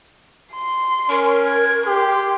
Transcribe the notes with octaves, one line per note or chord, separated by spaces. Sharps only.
C6
C#4 A#4
G#6
G4 C6